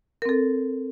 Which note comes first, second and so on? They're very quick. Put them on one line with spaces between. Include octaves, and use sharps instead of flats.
A#4 C4 A4